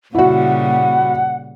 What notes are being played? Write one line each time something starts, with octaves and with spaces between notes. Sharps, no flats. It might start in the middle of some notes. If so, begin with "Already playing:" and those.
A#2 C#3 G3 E4 F#4 F#5